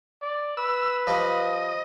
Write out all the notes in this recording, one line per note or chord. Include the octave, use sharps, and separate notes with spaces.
D5
B4 E6
F3 G3 D#5